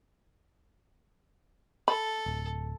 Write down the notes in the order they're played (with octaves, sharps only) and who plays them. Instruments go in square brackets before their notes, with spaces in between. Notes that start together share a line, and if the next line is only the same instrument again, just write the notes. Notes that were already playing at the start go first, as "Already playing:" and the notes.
[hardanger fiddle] A4 [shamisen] B5
[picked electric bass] D1